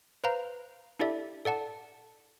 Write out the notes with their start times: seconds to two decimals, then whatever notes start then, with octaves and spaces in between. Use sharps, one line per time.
0.24 B4 C5 F5 A#5
0.99 D4 E4 G4 A4 D5 E5
1.45 A4 D5 F#5 A5